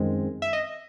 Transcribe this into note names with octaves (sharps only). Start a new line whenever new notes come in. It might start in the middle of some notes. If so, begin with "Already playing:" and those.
Already playing: F#2 D#3 G#3 C4
E5
D#5